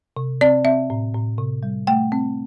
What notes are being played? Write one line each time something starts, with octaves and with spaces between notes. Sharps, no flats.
C3
C4 D5
C4 E5
A2
A2
C3
G3
A3 G5
C4